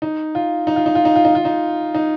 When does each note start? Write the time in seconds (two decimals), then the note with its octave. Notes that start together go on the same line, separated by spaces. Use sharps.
0.02 D#4
0.35 F4
0.67 D#4
0.76 F4
0.86 D#4
0.95 F4
1.05 D#4
1.16 F4
1.25 D#4
1.35 F4
1.45 D#4
1.94 D#4